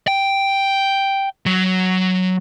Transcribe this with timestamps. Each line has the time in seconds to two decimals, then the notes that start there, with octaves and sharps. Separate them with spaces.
0.08 G5
1.46 F#3 F#4